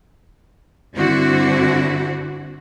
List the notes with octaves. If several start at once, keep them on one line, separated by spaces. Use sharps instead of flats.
G2 D3 C4 E4 F#4